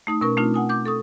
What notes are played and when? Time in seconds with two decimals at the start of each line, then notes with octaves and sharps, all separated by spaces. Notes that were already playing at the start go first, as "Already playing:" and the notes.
0.07 A3 D#4 D#6
0.21 B2 C#4 A#4 C#6
0.37 A3 C4 D4 D#4 F4
0.54 F#5 G#5 D#6
0.69 D6 G6
0.86 A4 C#6 D#6